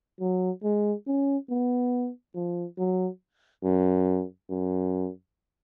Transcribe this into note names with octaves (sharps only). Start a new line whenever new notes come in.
F#3
G#3
C#4
B3
F3
F#3
F#2
F#2